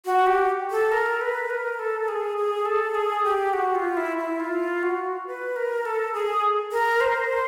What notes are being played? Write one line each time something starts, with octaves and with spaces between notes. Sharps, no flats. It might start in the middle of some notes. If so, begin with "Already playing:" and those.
F#4
G4
A4
A#4
B4
A#4
A4
G#4
G#4
A4
G#4
G4
F#4
F4
E4
E4
F4
F#4
B4
A#4
A4
G#4
A#4
C5